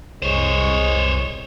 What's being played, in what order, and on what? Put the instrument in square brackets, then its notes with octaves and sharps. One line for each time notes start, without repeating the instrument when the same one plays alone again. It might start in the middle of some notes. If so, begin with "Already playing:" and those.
[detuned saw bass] C2 [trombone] G#3 [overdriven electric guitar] C5 C#5